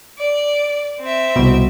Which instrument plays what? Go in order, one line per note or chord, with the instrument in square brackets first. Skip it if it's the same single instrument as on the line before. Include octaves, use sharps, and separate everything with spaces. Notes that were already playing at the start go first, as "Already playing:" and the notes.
[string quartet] D5
C4 E5
[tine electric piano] C2 B2